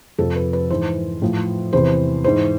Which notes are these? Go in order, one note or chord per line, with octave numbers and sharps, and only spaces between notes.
F2 C3 F3 A4
B4
B4
G#2 E3 C5
A2 F3
E2 C3 E3 C5
G#2 E3 C5